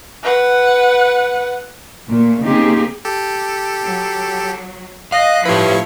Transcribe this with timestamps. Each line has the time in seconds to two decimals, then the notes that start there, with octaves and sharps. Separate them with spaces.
0.23 B4 F#5
2.08 A#2 A3
2.43 C#3 A#3 C4 D#4 G4 G#4
3.05 G4 A4
3.81 F#3
5.12 D#5 F5 F#6
5.45 A2 F3 E4 G4 B4 C#5